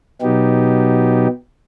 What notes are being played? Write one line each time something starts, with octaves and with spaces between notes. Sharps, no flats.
B2 F#3 B3 D#4 G4